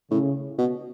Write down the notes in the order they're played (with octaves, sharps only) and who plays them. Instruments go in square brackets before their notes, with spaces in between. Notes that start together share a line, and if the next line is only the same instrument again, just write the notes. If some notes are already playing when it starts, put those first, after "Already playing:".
[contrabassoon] A2 [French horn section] C#3
[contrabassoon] B2